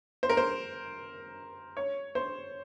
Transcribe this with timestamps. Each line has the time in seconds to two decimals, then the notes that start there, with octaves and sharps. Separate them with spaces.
0.23 C5
0.30 A#4
0.37 C5
1.77 C#5
2.15 C5